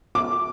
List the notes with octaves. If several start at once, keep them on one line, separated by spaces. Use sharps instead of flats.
D6